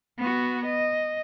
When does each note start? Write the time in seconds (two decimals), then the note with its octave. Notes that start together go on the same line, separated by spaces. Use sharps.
0.18 B3 F#4
0.65 D#5